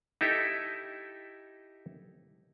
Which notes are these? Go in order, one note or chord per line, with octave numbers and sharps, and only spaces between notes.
D#4 E4 G4 A4 E5